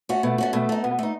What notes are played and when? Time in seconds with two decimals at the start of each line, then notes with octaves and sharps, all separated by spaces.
0.09 A3 C#4 F#4
0.23 B2 A3
0.38 A3 C#4 F#4
0.53 B2 A3
0.69 A3 D#4
0.83 B2 B3
0.99 A3 D#4